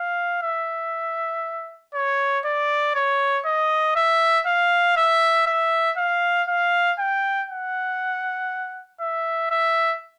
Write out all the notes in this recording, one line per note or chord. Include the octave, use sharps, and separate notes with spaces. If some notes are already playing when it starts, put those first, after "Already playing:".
Already playing: F5
E5
C#5
D5
C#5
D#5
E5
F5
E5
E5
F5
F5
G5
F#5
E5
E5